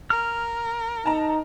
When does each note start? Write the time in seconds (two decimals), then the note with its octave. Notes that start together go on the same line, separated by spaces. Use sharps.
0.10 A#4 F6
1.06 D#4 A5 A#5